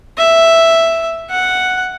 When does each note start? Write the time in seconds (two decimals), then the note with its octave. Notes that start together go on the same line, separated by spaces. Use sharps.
0.18 E5
1.31 F#5